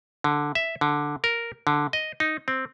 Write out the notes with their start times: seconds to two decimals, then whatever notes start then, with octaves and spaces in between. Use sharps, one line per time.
0.24 D3
0.55 E5
0.81 D3
1.24 A#4
1.67 D3
1.93 D#5
2.20 D#4
2.48 C4